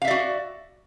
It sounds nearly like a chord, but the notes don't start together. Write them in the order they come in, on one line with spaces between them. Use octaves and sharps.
F5 E5 D5 F#4